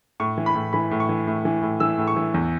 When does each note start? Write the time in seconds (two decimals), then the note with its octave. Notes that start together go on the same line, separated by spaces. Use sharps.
0.20 A2 C#6
0.38 E3
0.46 B5
0.55 A2
0.73 E3 B5
0.91 A2
1.00 C#6
1.09 E3
1.27 A2
1.45 E3
1.62 A2
1.80 E3 E6
1.98 A2
2.07 C#6
2.16 E3
2.34 E2